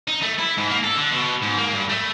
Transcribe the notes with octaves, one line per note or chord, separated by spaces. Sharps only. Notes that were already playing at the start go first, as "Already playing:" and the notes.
D#4
A3
E4
G#2
A#3
A4
D3
B2
G#2
A#3
G2
A3